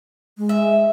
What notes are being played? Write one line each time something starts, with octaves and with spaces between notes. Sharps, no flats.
G#3
E5